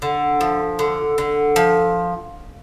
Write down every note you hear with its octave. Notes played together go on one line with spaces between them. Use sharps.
D3
F3
D3
D3
F3